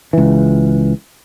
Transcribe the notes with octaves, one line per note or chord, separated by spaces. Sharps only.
C#2 E3